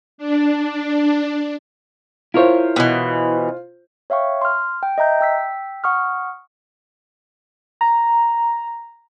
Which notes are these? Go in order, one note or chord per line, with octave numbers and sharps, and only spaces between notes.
D4
E4 F4 A#4 C5 C#5
B2 E3
C#5 E5 F5 G5 C#6
C6 F6
G5
D#5 E5 A#5 G6
G5 E6 B6
F#5 C#6 D#6 F6
A#5